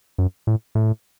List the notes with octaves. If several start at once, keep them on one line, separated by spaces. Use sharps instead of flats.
F#2
A2
A2